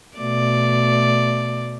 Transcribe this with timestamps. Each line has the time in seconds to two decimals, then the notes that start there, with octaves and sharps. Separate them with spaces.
0.17 B2 A3 D5